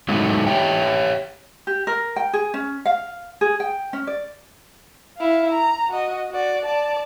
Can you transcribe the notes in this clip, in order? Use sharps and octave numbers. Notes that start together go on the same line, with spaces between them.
F#3 G#3 A3 D#4
G4 C#5 E5 G5
G4
A#4
G5
G#4
C#4
F5
G#4
G5
C#4
D5
E4 F5
A#5
F#4 D#5
F#4 D5
D5 A5